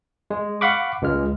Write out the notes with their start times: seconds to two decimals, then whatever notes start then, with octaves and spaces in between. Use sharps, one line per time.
0.30 G#3
0.61 F5 F#5 B5 C#6 D6
1.02 C#2 G#3 F6